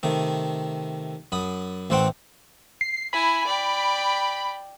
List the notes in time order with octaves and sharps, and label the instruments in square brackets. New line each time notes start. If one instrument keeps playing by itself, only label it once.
[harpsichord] C3 D#3 A3
F#2 B5 D#6
A1 A3 C4 C5 F#5 G5
[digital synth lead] C7
[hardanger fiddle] E4 G#5 [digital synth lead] B5
[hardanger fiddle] D5 G5